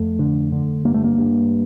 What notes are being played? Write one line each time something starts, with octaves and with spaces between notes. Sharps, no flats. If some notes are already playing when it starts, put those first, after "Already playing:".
Already playing: F2 A3
D3
D3
G2 A#3
A3
A#3
G2